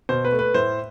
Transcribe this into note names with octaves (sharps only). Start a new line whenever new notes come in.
B2 C5
B4
A3
B4
A2 C5